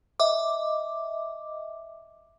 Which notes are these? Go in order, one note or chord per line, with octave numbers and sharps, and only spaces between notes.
D#5 E5 D6